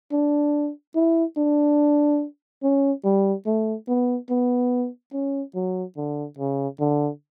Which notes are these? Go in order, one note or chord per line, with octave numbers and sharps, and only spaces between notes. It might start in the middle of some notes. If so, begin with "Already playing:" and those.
D4
E4
D4
C#4
G3
A3
B3
B3
C#4
F#3
D3
C#3
D3